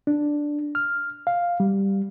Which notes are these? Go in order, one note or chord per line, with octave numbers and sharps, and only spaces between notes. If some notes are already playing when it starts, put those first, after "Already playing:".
D4
F6
F5
G3